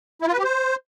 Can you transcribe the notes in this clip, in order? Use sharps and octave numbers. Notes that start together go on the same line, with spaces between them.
E4
F4
B4
G4
C5